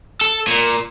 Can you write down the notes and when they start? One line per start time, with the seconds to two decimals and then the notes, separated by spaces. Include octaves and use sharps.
0.21 A4
0.48 A#2